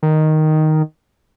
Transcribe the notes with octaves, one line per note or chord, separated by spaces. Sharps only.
D#3